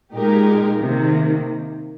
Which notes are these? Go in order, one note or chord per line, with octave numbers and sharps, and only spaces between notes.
A#2 G#3 D#4 G4 A#4
C3 D#3 A#3